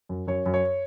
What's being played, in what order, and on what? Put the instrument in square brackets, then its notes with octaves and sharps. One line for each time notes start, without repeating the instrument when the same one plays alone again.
[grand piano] F#2
F#2 C#5
F#2
C#5